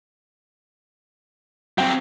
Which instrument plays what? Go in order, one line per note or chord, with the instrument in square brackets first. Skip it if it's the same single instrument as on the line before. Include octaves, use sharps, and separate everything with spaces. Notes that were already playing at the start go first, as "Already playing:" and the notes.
[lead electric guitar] F#3 C4 [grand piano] G5